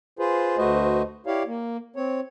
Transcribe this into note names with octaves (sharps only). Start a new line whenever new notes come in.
F4 G#4 B4 C5
D2 A3 F#4 B4 C5 D#5
E4 G4 C#5 D5 F5
A#3
C4 C#5